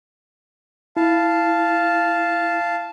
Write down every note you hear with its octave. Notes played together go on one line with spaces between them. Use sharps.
E4 F5 A5